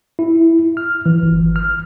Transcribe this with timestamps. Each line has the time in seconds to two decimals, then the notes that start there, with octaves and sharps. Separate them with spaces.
0.19 E4
0.77 F6
1.06 E3
1.22 G1
1.56 F6